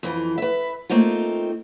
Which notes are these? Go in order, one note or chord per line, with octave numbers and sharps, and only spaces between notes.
F2 E3
B4 E5
A3 A#3 C4 D#4 F4